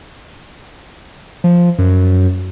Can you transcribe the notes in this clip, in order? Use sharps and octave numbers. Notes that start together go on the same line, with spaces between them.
F3
F#2